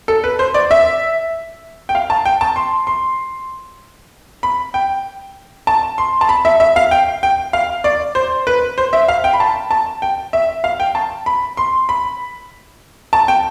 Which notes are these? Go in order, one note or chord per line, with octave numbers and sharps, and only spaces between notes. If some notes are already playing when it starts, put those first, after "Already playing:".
A4
B4
C5
D5
E5
G5
F5
A5
G5
A5
C6
C6
B5
G5
A5
C6
A5
B5
E5
E5
F5
G5
G5
F5
D5
C5
B4
C5
E5
F5
G5
B5
A5
A5
G5
E5
F5
G5
A5
B5
C6
B5
A5
G5